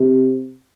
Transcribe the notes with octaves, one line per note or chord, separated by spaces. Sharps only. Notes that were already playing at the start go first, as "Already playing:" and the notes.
Already playing: C3